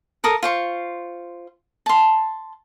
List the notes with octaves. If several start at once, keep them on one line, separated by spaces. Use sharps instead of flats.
A4 A#4 D#6
F4 C5 C#6
A5 C6